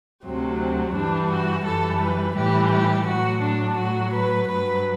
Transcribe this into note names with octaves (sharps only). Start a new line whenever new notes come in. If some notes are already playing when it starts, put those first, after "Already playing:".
D2 C3 F#3 C4
C4
G2 E3 G3 D4
F#4
F#2 E3 G3 A4
B4
A2 E3 G3 G4
G4
A2 F#3 F#4
D4
A2 F#3 F#4
B4
G2 F#3 B4